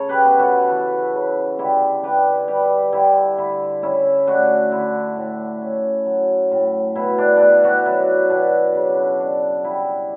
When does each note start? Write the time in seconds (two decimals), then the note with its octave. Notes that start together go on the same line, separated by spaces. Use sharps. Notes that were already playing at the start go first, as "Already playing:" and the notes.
Already playing: C#3 A4 C#5
0.09 G4 B4
0.25 B3
0.39 F#4 A4
0.69 E3
1.14 C#3
1.58 D3 E4 G4
2.03 D4 G4 B4
2.48 G3 G4 B4
2.93 D3 E4 G4
3.38 D3 E4
3.83 C#4 E4
4.27 A3 D4 F#4
4.72 D3 E4
5.16 A2
5.62 C#4
6.06 F#3
6.51 A2
6.95 B2 E4
7.18 D4
7.37 B3 D4 E4
7.64 D4 F#4
7.86 F#3 E4
8.30 B2 D4
8.75 C#3
9.20 D4
9.64 G3 E4